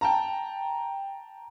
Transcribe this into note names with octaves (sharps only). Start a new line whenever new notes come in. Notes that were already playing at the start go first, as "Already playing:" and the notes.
G5 A5 A#5